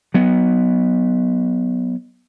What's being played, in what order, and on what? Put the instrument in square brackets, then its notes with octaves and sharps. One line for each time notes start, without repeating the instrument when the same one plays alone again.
[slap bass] F#3 B3